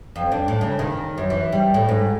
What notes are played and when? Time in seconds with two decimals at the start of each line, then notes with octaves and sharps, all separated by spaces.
0.16 F2
0.32 D4
0.48 A2
0.61 C#3
0.79 D#3
1.18 F#2
1.30 E3
1.52 G3
1.74 A2
1.89 G#2